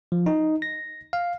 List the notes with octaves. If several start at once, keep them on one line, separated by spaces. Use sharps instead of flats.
F3
D#4
A#6
F5